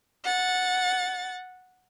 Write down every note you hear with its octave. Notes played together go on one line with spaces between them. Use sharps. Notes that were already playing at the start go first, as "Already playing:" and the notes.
F#5 A6